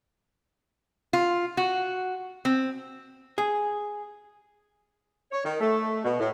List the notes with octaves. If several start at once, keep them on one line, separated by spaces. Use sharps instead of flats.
F4
F#4
C4
G#4
C#5
D#3
A3
B2
A2